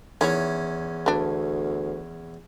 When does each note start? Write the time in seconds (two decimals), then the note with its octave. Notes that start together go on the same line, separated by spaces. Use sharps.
0.21 E2 D#3 C#4 E4 C#5
1.06 D2 B3 D4